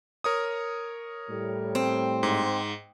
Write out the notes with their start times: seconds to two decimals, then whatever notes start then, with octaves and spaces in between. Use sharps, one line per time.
0.24 A#4 C#5 D#6
1.29 A2 G3
1.75 C4
2.23 G#2